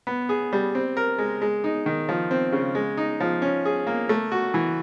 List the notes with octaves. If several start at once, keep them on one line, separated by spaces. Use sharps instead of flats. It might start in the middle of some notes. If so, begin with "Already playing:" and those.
B3
G#4
G3
C4
A#4
G#3
G#3
D#4
D#3
F3
C4
C#3
G#3
D#4
F3
C#4
G#4
A#3
A3
F#4
E3